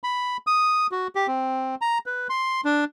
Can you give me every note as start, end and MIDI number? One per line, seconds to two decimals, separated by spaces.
0.04 0.37 83
0.47 0.87 87
0.92 1.07 66
1.15 1.27 67
1.27 1.75 60
1.81 1.98 82
2.06 2.27 71
2.30 2.61 84
2.65 2.84 62